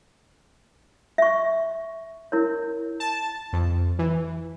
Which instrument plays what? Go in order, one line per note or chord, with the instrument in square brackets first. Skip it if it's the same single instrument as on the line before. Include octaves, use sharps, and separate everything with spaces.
[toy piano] E5 C#6
E4 A#4 C#5
[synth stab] A5
F2
E3